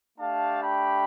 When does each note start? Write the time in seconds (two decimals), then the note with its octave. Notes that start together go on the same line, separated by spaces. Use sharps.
0.18 A3 D4 G4 F5 A5
0.62 G5 B5